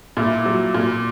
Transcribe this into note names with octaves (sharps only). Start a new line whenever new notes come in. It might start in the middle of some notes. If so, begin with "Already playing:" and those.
A#2 E4
F#3
A#2